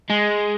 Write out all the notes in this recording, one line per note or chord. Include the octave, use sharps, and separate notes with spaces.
G#3